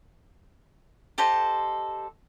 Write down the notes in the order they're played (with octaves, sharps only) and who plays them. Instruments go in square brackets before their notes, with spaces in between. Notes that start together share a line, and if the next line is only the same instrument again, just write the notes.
[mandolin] G4 A4 C5 D#5